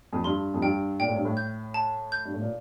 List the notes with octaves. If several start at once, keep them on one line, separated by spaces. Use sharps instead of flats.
F2
G2 C6
F2
G2 G5
A#2 G5
A2
G2
A2
G6
A5
G6
G2
A2
A#2